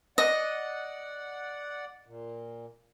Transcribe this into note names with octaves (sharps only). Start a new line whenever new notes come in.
D5 D#5 F#5
A#2